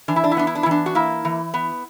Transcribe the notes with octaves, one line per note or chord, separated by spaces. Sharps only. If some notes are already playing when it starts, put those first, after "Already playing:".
E3 D4
E4
D4
E4
B3 D4
E4
D4
E4
E3 D4
F#4
A#3 E4
E3
B3